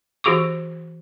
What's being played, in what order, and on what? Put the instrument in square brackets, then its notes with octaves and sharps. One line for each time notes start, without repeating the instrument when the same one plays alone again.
[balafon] E3 F#4 G#4 C#6 D6